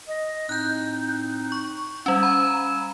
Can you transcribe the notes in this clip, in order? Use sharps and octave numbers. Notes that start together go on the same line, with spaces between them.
D#5
A2 C4 D#4 F#6 G6
C#6
G3 C#4 F5 G#5 E6
A#5 B5